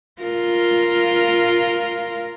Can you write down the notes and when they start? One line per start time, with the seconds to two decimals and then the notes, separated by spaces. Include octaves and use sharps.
0.22 F4 A#4